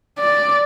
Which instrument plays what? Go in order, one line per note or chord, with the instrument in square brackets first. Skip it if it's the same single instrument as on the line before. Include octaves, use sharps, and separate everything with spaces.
[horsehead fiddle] D5